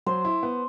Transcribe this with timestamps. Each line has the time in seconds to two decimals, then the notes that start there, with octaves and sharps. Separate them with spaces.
0.06 F#3 C5
0.25 E4
0.43 B3